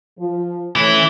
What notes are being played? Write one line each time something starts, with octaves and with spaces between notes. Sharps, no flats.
F3
D2 E3 A3 C#4 E4